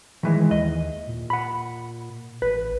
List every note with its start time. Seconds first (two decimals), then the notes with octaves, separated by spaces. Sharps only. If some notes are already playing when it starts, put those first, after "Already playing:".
0.23 D#3 E3 G#3
0.51 D#2 D#5
1.08 A#2
1.30 F#5 B5
2.42 A1 B4